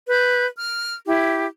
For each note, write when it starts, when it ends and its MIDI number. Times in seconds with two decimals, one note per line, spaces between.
0.08 0.46 71
0.08 0.46 91
0.56 0.94 89
1.06 1.45 64
1.06 1.45 67